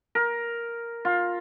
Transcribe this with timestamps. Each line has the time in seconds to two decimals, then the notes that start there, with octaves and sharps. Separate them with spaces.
0.15 A#4
1.05 F4